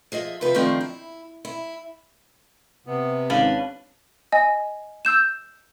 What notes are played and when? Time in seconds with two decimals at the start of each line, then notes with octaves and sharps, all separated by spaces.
0.12 F3 G#4 D#5 E5
0.41 C3 F3 B4 C5 E5
0.55 D#3 F3 A3 C4 D4
0.81 E4
1.45 E4
2.86 C3 B3
3.30 G#1 C#4 D4 B4 F5
4.32 D#5 G#5
5.05 E6 G6 E7